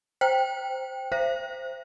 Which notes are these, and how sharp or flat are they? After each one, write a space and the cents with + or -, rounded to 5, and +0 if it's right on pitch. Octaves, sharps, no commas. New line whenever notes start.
C5 +0 G5 +0
C5 +0 E5 +40